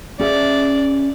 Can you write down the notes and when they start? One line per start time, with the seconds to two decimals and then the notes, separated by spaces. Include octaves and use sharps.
0.19 C#4 G#4 D5 E5